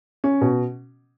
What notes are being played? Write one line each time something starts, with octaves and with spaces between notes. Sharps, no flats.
C#4
B2